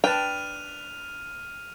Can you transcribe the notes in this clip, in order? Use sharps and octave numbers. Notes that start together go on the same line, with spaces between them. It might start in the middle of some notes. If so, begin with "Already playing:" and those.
D4 B4 G5 A5 F6 D#7 F7